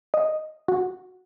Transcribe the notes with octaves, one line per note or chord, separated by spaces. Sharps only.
D#5
F#4